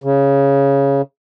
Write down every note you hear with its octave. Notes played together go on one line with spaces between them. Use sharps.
C#3